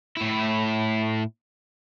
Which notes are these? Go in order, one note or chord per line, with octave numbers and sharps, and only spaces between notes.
A2 E4